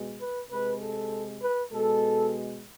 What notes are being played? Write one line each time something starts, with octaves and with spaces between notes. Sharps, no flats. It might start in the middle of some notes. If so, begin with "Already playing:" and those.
Already playing: B2 G#3
B4
C3 G#3 B4
A4
B4
B2 G#3 A4